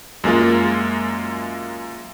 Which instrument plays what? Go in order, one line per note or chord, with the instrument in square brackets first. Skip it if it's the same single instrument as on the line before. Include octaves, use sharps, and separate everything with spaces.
[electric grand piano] F#2 G#3 A#3 F4